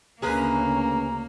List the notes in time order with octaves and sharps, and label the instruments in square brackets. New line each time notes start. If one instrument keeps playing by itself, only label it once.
[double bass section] D2 C#3 C#4 [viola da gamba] A#3 [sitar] G#4 A#4 B4 [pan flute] A#5